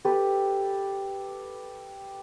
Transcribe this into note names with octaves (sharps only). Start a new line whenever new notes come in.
G4 A4 B4